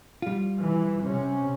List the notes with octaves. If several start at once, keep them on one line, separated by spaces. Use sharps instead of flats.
G3 F4
E3
C3 C#4